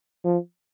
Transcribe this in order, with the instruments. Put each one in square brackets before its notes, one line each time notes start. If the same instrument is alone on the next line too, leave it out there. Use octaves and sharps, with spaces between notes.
[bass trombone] F3